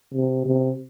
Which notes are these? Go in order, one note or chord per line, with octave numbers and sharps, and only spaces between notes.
C3
C3